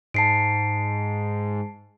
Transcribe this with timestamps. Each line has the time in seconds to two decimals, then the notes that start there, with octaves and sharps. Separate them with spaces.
0.14 G#2 A5 C7 D7